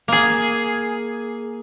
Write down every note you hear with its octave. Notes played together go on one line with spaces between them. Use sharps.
A#3 G#4